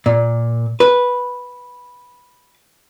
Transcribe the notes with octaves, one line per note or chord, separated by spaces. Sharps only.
A#2
B4